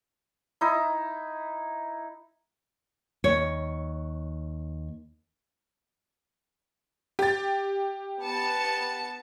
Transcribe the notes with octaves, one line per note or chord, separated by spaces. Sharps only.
D#4 E4
D#2 C#5
G4 A6
B3 A5 C#7